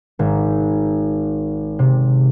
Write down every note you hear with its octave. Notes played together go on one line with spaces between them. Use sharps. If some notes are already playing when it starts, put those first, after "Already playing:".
G#1
C3